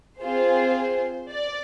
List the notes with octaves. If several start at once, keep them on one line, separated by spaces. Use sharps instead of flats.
C4 F4 G#4 C5
D5